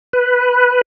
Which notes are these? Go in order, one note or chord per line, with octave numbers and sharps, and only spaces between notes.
B4